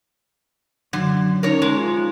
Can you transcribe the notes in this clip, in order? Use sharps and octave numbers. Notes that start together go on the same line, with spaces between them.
F#2 D3
C#4 D#4 A#4 C#5
G#3
F4 C5 G#5